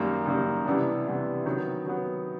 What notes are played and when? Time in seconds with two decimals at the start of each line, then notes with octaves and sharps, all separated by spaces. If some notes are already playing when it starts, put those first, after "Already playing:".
Already playing: F#2 D#3 G3 A#3
0.26 F#2 D#3 G3 A#3
0.66 C3 E3 G3 B3 D4
1.06 C3 E3 G3 B3 D4
1.46 D#3 F#3 B3
1.86 D#3 F#3 B3